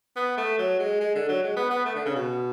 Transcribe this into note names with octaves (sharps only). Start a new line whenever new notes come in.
B3
A3
F#3
G#3
G#3
D3
F#3
G#3
B3
B3
A3
D3
C#3
B2